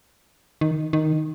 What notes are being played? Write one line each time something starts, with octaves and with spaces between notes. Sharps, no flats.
D#3
D#3